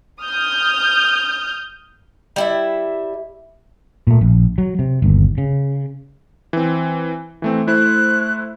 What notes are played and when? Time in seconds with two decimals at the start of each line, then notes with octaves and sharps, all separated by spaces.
0.22 D#6 F6 G6
2.36 G3 E4 E5
4.07 A#2 A3
4.21 A#1
4.58 F#3
4.79 C3
5.02 G1 D#2
5.38 C#3
6.53 E3 C4
7.42 E3 A3 C4
7.67 A3 E4 C5 F#6